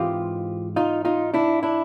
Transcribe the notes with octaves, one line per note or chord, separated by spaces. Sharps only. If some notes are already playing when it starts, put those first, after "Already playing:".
Already playing: G#2 E3 G#3 C4 F4 G4
D#4 F4
D#4 F4
D4 E4
D4 E4